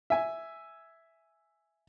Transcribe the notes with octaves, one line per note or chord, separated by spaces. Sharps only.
E5 G#5